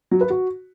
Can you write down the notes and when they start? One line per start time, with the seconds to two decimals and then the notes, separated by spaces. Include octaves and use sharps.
0.11 F#3
0.21 B4
0.30 F#4